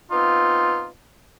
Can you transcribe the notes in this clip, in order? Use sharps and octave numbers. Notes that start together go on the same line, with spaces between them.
B3 C4 D#4 F4